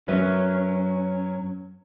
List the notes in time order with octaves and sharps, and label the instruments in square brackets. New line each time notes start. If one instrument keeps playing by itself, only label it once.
[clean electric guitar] F#2 B4 E5 [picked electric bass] F#3 [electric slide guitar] C#4